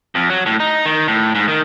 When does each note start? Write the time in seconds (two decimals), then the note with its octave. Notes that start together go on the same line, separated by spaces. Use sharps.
0.15 F2
0.30 F#3
0.46 A2
0.60 D#4
0.86 D#3
1.08 A2
1.35 G#2
1.48 D#3